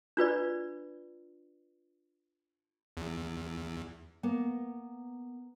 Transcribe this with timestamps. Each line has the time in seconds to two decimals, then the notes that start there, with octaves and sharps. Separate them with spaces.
0.17 D4 F4 B4 D5
2.97 E2
4.23 A#3 B3